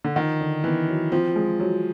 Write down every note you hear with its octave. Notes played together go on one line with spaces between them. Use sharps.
D3
D#3 F3
D3
E3 B3
F#3
F3 C4
G#3
F#3